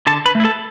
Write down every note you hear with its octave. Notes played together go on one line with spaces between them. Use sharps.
D3 A4 A5
B4 B5
A3 E4
A4 A5